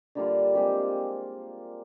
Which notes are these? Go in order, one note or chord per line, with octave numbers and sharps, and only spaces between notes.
D3 G3 A#3 F4
G#3 C4 G4